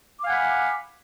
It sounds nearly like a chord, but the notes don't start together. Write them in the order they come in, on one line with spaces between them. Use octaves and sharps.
D6 F5 G#5 F#5 B5